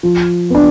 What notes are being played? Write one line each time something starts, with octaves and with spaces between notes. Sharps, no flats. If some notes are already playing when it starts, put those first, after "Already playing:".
F3
B3 D4